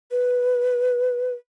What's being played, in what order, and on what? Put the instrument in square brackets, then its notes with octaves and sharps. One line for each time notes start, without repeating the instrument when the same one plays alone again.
[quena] B4